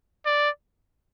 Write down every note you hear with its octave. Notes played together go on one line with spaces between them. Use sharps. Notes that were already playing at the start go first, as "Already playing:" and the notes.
D5